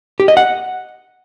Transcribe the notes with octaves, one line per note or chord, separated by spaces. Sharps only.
G4
D#5
F#5